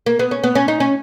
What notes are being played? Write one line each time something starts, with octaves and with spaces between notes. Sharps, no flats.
A#3
B3
C#4
B3
C#4
D#4
C#4